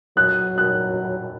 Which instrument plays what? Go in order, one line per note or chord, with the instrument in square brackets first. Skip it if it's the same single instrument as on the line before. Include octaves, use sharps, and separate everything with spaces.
[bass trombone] F#3 [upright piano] F#6
[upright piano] F#6